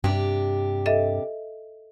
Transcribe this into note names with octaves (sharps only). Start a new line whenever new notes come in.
G2 C3 D4 G4
A4 D#5 E5